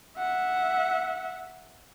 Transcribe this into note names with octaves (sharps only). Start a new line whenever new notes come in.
E5 F#5